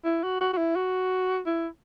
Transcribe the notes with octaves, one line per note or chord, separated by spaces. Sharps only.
E4
F#4
F#4
F#4
E4
F#4
E4